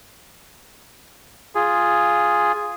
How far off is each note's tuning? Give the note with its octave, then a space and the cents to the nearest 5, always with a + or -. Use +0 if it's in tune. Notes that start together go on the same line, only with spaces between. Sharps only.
F4 +0 G#4 +0